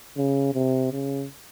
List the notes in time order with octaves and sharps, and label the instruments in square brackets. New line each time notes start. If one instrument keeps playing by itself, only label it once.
[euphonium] C#3
C3
C#3